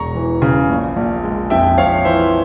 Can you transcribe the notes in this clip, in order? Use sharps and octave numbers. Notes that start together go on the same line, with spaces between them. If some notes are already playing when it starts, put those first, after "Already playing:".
Already playing: E1 A#5 C#6
E3
C#3
A#1
A#1
G#3
F2 E5 G5
F2 C#5 F5
E3 C5 E5